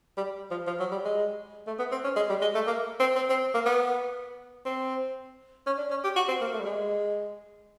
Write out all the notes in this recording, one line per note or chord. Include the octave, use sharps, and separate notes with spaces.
G3
F3
F3
F#3
G3
G#3
A3
B3
C4
C#4
G#3
G3
G#3
A3
A#3
C4
C4
C4
A#3
B3
C4
C#4
D4
C#4
G4
F#4
C4
A#3
A3
G3
G#3